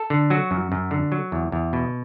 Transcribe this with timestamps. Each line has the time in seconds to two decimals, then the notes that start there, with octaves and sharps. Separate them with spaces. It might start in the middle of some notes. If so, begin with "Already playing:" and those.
Already playing: A4
0.10 D3
0.30 F#3 F#4
0.51 F#2
0.72 F#2
0.91 D3
1.12 F#3
1.32 E2
1.52 E2
1.73 B2